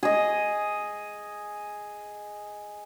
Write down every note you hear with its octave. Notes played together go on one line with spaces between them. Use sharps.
G#4 D#5